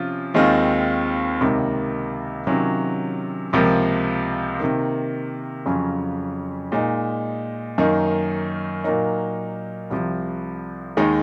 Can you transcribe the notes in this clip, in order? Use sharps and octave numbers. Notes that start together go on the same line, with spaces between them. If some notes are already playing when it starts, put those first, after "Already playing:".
Already playing: C3 F3 C#4 F4
D#2 D#3 G#3 C4 F4
C#2 C3 D#3 A#3
C3 D#3 F#3 C#4 F4
C#2 C3 F3 A#3
C3 D#3 A#3
F2 C#3 F#3 C#4 F4
A#2 G#3 D#4
F#2 D#3 A#3 D#4
A#2 F#3 A#3 D#4
C2 C3 F3
D#2 D#3 G#3 D#4